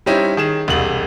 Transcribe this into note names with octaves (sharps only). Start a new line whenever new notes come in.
G3 C4 C#4 D#4 E4 G4
D#3 G#4 E7
E1 C2 F#7